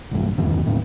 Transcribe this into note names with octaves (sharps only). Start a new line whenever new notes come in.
B1 G2
D1 E2 G2 D#3
D#2 A2